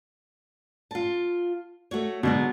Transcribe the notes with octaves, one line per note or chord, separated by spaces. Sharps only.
F4 A5
A3 F#4 C#5
B2 D3 F#3 G#3